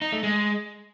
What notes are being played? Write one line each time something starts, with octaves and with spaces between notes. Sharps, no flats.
D#4
A3
G#3